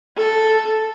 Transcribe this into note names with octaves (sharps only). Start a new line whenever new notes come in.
A4